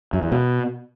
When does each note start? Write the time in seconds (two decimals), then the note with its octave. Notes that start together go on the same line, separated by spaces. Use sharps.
0.13 F#2
0.23 E2
0.32 B2